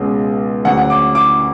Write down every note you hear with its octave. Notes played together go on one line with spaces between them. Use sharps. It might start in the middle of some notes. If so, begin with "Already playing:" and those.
Already playing: C#2 B2 G#3 C#4
D2 D3 F#3 C#4 F#5
F#5
D6
D6